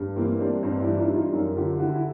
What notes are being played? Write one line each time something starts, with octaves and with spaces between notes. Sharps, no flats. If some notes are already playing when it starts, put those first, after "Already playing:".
Already playing: G2
E3 A#3 C4
G3 C4 D4
G2 C4 D4
D4 E4
E3
D#4 F4
G3
D#4 F4
F#2
D3 F4 G4
D3 E4 F#4
E4